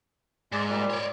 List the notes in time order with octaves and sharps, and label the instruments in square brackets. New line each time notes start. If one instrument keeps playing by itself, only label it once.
[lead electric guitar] G#2 [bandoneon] G#3 D5
[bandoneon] A#2 G3
[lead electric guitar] C#5 D5